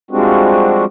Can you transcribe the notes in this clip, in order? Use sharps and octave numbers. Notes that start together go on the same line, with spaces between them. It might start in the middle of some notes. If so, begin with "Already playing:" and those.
F3 G3 G#3 C4 D4 F#4